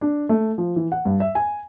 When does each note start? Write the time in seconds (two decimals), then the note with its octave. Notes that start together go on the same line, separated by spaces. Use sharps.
0.01 D4
0.29 A3
0.58 F3
0.76 E3
0.92 F#5
1.05 G2
1.20 E5
1.35 G#5